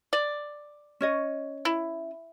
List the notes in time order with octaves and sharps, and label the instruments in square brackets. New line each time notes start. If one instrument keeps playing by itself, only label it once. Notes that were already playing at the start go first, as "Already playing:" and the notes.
[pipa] D5
[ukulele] C#4 C#5 D#5
[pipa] E4